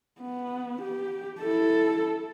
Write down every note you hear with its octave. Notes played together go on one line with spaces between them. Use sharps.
B3
G4
E4 A4